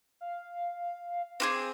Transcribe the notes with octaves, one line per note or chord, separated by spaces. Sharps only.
F5
C4 F#4 G#4 D6